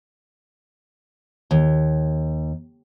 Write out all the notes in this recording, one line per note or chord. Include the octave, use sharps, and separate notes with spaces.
D#2